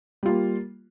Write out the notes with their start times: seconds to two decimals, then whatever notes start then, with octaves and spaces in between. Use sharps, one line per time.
0.23 G3
0.26 F4
0.29 A#3